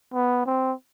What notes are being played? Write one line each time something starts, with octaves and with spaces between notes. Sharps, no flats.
B3
C4